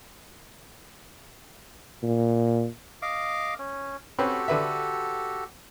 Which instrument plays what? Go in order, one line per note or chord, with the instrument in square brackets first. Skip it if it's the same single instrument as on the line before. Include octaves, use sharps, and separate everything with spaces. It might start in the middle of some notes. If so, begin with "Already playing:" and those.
[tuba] A#2
[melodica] D#5 F5 D6
C#4
[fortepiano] C4 C#4 B4 [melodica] F#4 G4 A4
[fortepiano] D3 B4 E5